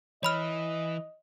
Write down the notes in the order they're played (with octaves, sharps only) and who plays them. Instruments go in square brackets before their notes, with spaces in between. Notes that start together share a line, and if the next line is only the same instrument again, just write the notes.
[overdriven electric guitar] E3 [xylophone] C#5 B5 F6 [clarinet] D#5